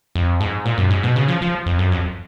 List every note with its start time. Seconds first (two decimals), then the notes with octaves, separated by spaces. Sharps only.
0.15 F2
0.40 G#2
0.65 A#2
0.78 F#2
0.90 G#2
1.03 B2
1.16 C#3
1.28 F3
1.42 F3
1.66 F2
1.78 F#2
1.92 F2